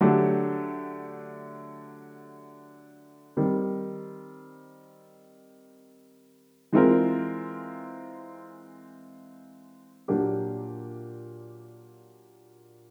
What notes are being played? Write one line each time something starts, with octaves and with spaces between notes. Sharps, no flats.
D3 F#3 A3 D4 G4
D#3 G3 C4
E3 G#3 C4 F4 A#4
A#2 F#3 A#3 D4 G4